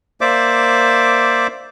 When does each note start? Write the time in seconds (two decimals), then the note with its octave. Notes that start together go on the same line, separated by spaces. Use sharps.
0.21 A#3 C5 D5 E5 D6